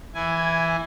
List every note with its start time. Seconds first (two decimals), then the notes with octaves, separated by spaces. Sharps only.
0.14 E3 E4 G#5